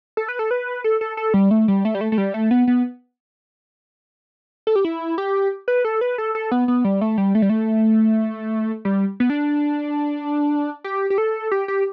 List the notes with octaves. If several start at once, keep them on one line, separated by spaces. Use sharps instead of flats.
A4
B4
A4
B4
A4
A4
A4
G3
A3
G3
A3
G3
A3
A3
G3
A3
B3
B3
A4
G4
E4
G4
B4
A4
B4
A4
A4
B3
B3
G3
A3
G3
A3
G3
A3
G3
B3
D4
G4
G4
A4
G4
G4